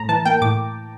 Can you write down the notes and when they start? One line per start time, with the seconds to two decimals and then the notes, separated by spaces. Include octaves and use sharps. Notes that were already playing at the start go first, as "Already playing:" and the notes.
Already playing: A2 A#5
0.09 E3 A5
0.25 A#3 G5
0.41 A2 D6